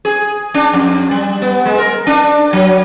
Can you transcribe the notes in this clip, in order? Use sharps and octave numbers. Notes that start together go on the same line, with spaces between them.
G#4
D4
F2
G3
B3
G#3
A#4
D4
F#3